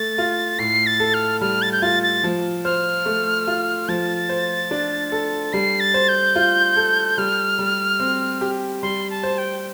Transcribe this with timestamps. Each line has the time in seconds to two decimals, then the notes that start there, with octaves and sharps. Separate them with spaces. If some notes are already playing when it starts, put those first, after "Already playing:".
Already playing: A3 A6
0.18 F4
0.59 A2 C7
0.87 A6
1.00 A4
1.14 F6
1.41 G3 F6
1.62 A6
1.72 G6
1.82 F4 A6
2.03 A6
2.24 F3
2.65 C5 F6
3.06 A3
3.47 F4
3.89 F3 A6
4.29 C5
4.71 D4
5.12 A4
5.53 G3 C7
5.80 A6
5.94 C5
6.08 G6
6.36 F4
6.76 A4
7.18 G3 F6
7.59 G3
8.00 C4
8.41 G4
8.82 G3 C6
9.10 A5
9.23 C5
9.38 G5